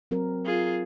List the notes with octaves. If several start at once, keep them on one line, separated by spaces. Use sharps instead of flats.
F#3 C4 A#4
F4 G#4